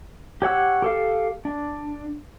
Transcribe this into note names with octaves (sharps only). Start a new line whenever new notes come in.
G4 C#5 F#5 E6
G4 A4 F5
D4